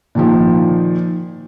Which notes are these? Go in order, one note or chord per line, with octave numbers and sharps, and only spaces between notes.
A#2 D#3 F3